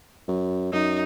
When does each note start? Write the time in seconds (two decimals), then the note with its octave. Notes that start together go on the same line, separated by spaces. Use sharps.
0.28 F#2
0.73 F#2 D#4